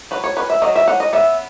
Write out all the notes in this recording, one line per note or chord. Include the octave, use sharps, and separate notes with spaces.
F#3 B4
C#5
C#4 B4
E5
F#3 D#5
E5
C#4 F#5
D#5
B3 E5